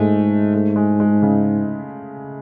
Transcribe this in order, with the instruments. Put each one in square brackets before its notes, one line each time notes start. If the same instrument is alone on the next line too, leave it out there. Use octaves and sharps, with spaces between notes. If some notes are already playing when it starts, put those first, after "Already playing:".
Already playing: [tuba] G#2 [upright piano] G#3 A3
[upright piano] A3
G#3
G#3
C#3